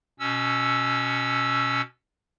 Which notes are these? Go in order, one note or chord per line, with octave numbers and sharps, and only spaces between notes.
B2 C#4 E6